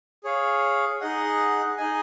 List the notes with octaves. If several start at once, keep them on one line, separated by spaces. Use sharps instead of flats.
G#4 C#5 F5
D#4 G#4 D#5 F#5
D#4 G#4 D#5 G#5